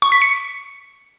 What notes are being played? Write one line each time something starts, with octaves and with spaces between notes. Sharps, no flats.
C#6
B6
C#7